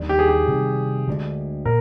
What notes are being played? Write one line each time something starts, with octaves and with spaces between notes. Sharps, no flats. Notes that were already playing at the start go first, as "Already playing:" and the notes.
Already playing: D#2 D#3 G3 D4
G4
G#4
G4
C3 D#3 G3
D2 D3 G#3 D4
A#2 A#4